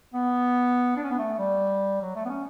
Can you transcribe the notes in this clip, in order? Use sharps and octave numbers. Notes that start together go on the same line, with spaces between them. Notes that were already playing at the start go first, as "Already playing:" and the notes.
B3
D4
C#4
B3
A3
G3
F#3
A3
B3
C#4